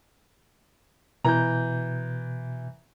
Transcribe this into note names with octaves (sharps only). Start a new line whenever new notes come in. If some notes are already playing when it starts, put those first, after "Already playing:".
B2 E3 A#5 G6